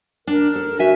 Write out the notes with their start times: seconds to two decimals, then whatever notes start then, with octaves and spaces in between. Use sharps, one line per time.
0.27 D4 A#4
0.56 A4
0.79 F#4 E5 G#5